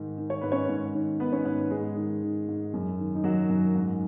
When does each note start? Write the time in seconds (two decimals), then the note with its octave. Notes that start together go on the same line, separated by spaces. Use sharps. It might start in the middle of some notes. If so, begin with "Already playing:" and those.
Already playing: G#2 D#3
0.18 D#3
0.30 C#5
0.41 G#2 B4
0.52 C#4 C#5
0.69 G#2
0.95 D#3
1.20 D#3 B3 B4
1.32 C#4 C#5
1.45 G#2 B3 B4
1.71 G#2 G#3 G#4
1.96 D#3
2.23 D#3
2.48 G#2
2.74 F#2
2.99 D#3
3.15 D#4
3.24 D#3 F#3 F#4
3.49 F#2
3.75 G#2